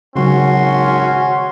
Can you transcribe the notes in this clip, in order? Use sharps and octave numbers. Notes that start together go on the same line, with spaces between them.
G#1 C#3 F#3 C#4 F#4 C6